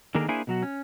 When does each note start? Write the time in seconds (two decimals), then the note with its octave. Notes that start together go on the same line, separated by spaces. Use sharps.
0.15 D3 D#3 A#3 D4 G#4 A#4
0.28 A#3 D4 E4 G#4 C5 G#5
0.47 B2 F#3 F#4
0.63 C#4